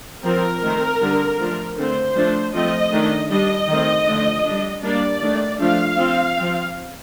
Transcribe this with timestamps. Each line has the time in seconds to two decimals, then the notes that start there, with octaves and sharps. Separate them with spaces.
0.24 F3 C4 A#4
0.63 D#3 A3 C4
1.01 D3 G3 D4
1.39 F3 A3 D4
1.77 D3 A3 C4 C5
2.15 F3 A3 D4
2.53 F3 A3 C4 D#5
2.92 D#3 A3 D4
3.30 G3 D4 D#5
3.68 D#3 A3 C4
4.07 D3 F3 A3 D4
4.46 G3 D4
4.83 G3 A#3 D4 D5
5.21 D#3 A3 D4
5.59 F3 A3 D4 F5
5.98 F3 C4
6.36 F3 C4